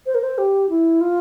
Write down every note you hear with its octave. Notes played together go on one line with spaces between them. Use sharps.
C5
A#4
C5
G4
E4
F4